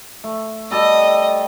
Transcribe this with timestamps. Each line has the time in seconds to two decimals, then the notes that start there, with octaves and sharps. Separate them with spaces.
0.24 A3
0.71 G3 A4 D#5 A5